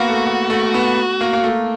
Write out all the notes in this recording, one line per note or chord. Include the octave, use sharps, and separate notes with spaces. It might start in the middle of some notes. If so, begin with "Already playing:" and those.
Already playing: A#3 B3 F#4
A3
A3
A3
B3
A#3
A#3
A3